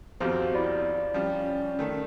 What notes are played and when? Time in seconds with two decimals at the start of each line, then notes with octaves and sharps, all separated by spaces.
0.20 G#1 F2 F3 B3 F#4 G4 C5
0.55 E4 D5 B5
1.14 F3 G3 C#4
1.79 D#3 A3